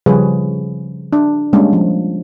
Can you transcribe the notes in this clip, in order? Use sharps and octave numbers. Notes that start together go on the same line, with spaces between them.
C#3 F3 G3 G#4 B4 C#5
D4
G3 G#3 A#3 C#4 D4
F3